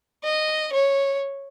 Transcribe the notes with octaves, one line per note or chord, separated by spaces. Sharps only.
D#5
C#5